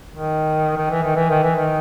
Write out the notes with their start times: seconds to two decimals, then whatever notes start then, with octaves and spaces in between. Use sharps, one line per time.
0.12 D#3
0.77 D#3
0.90 E3
1.03 D#3
1.16 E3
1.30 D#3
1.43 E3
1.56 D#3